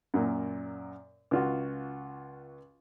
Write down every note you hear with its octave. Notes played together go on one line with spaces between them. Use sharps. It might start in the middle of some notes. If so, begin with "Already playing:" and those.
F#2 A#2
C#2 F4 F#4